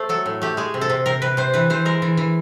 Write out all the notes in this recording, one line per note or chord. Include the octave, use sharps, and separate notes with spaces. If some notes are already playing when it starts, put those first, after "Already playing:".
Already playing: A3 C5
F#3 A4
A2
A3 G4
G#3 G#4
C3
A4
C3
C3 A#4
C3 B4
C3 C5
E3 B4
E3 C5
G#3 A#4
E3
E3